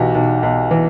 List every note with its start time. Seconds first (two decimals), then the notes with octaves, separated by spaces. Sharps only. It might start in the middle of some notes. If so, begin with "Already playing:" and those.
Already playing: B1 E3 F#4 G4
0.15 B1
0.43 B1
0.71 E3